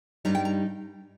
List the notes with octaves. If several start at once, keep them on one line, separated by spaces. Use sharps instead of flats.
G2 G3 D#4 A#5
G5
A#5